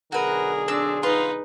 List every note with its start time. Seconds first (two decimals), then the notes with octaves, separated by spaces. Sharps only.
0.12 B1 D3 F#4 G#4 A#4 B4
0.68 C4 D4 E6
1.03 D#4 F4 B4 C6